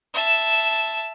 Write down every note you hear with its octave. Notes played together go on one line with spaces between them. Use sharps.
E5 A5